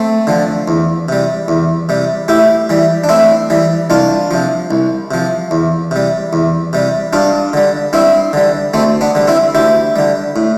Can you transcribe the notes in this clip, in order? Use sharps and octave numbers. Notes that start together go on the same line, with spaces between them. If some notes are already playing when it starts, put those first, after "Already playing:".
Already playing: A3 C4
D3 F3
E2
C3 G3
E2
C3 G3
A2 E4 G4
E3 G3
D4
A2 C4 E4
E3 G3
C2 D4 F4
C3 F3
C2
C3 F3
E2
C3 G3
E2
C3 G3
G2 D4 F4
D3 G3
G2 C4 E4
D3 G3
D2 A3 C4
B3 D4
D3 G3
C4 E4
D2 E4 G4
D3 G3
A2